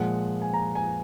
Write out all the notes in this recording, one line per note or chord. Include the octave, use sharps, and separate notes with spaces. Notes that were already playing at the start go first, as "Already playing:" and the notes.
Already playing: A#2 F3 G#3 F#5
G#5
A#5
G#5